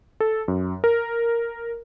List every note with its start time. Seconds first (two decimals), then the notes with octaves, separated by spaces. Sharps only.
0.20 A4
0.48 F#2
0.84 A#4